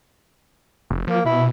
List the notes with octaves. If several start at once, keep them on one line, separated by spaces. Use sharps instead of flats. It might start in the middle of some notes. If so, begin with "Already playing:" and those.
F1
F3 A#3
B2 E4